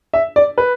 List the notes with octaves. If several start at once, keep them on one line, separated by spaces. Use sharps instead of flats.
E5
D5
B4